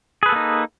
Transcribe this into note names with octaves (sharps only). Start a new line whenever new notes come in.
A#3 D#4 G#4 A4 B4